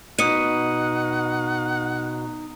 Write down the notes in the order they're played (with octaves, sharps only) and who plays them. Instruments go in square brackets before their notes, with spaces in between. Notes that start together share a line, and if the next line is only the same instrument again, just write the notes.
[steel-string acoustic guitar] B2 [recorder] D#4 [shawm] F#5 [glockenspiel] D#6 C#7 D#7